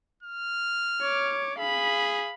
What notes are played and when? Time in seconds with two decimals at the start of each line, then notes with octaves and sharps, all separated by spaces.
0.23 F6
1.02 C#5 D6
1.59 G#4 F5 B5